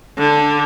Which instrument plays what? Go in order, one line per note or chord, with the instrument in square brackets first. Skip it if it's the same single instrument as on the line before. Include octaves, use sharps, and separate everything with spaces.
[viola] D3